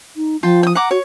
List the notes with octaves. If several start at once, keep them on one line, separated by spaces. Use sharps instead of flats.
D#4
F3 F4 G5 A5
G5 D#6
F#5 A#5 D6
F#4 C#5